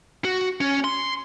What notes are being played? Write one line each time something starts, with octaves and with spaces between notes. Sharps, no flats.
F#4
C#4
C6